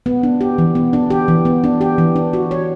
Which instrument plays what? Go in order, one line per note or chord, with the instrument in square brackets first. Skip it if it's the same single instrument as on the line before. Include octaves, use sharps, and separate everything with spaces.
[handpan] B3
D4
G4
E3
B3
D4
G4
E3
B3
D4
G4
E3
D4
F#4
C#5